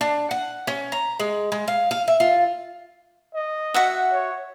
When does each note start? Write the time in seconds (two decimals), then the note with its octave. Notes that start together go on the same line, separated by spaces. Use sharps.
0.01 D4
0.31 F#5
0.67 C#4
0.92 A#5
1.20 G#3
1.52 G#3
1.68 F5
1.91 F5
2.08 E5
2.20 F4
3.35 D#5
3.74 F#4 E5 F#5
4.12 C#5